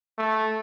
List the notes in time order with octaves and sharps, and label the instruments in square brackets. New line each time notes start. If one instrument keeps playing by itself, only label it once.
[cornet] A3